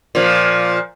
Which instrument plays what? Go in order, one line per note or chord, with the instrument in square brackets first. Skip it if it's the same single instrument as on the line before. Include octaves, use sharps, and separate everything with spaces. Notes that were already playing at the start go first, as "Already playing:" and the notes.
[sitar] A#2 F3